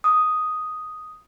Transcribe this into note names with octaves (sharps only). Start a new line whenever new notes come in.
D#6